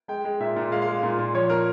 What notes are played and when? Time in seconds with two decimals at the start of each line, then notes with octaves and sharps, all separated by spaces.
0.08 G#3 G5
0.24 G#3
0.40 A#2 E5
0.56 A#2
0.72 G#3 F5
0.82 F5
0.87 G#3
1.03 A#2
1.19 A#2
1.34 F3 C#5
1.50 A#2 A#4